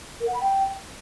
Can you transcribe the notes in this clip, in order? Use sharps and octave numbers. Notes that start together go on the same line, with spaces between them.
A#4
F#5
B5
G5